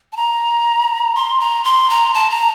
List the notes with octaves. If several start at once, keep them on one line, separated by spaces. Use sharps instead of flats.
A5
A#5
C6
A#5
C6
A#5
A5
A#5